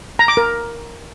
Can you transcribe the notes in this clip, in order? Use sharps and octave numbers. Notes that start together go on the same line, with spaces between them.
A#5
D6
A#4